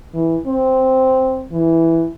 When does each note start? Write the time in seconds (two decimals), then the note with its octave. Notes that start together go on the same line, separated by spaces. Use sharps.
0.14 E3
0.47 C4
1.52 E3